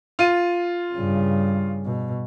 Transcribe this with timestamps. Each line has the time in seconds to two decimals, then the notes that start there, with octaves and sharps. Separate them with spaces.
0.19 F4 D#7
0.94 G2 C#3
1.86 B2